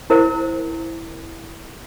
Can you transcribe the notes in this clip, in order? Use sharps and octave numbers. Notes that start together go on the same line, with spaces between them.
E4 A#4 C5